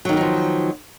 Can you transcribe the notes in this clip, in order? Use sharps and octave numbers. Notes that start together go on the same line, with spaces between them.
D#3 F3 F#3 B3 D#4